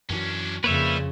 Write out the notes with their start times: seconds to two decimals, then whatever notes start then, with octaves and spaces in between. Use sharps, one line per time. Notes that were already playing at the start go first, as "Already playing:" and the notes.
0.10 F#2 E3 F#3 C#4 D4
0.64 F2 C#3 G3 A#3 B4 C#5 E5